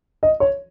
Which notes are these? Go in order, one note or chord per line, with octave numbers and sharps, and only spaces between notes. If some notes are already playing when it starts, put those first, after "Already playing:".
D#5
C#5